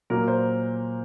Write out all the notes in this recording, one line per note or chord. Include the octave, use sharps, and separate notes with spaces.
A#2 F#3 A#3 A#4
C5